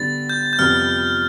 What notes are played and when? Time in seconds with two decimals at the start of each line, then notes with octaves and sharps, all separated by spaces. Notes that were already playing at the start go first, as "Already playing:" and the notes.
Already playing: D3 G3 B3 A6
0.29 G6
0.53 G6
0.59 F2 C3 G3 B3 F6